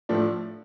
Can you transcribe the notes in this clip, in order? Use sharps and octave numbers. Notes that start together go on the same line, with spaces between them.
A2 F3 A3 D4